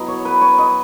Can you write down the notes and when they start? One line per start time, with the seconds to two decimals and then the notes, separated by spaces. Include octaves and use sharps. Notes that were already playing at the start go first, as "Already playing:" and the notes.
Already playing: F#3 B3 E4 D#5
0.08 C#5
0.25 B4
0.41 C#5
0.58 D#5